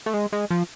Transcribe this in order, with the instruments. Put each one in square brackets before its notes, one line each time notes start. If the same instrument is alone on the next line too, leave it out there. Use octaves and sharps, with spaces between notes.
[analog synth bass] A3
G#3
G#3
F3